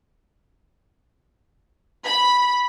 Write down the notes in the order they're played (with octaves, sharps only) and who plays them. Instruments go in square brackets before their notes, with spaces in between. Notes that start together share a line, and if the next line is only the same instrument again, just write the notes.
[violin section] B5